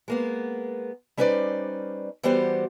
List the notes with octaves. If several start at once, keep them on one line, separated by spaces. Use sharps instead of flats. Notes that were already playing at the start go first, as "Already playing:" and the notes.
G#3 A#3 B3
G3 C#4 D#4 B4 C5 D5
E3 G3 B3 F#4 G4 C5